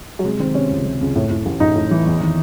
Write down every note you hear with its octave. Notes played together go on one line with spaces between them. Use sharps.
F#3
C3 G#3
D#3 C4
C3 C#4
C#2
C3
C#2
A2
A2
A1
A1 D#4
A2
E3
E2
D#3